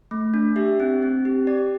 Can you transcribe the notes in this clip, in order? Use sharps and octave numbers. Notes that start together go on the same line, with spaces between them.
A3
D4
G4 E5
C4
C4
G4
G4 D5